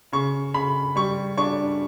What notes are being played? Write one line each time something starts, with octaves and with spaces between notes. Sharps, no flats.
C#3 C#6
C#3 B5
G3 C#6
D4 C#6